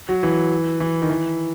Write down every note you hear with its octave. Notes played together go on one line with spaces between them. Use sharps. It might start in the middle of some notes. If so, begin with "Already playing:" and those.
F#3
E3
E3
D#3
E3